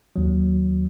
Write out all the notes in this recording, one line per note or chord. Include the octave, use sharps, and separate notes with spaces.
D#2 F#3